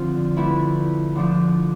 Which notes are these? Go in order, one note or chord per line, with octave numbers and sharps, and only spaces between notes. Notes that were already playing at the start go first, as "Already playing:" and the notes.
Already playing: D3 F3 C4 F4
D3 A3 E4 B4
D3 F3 A3 D4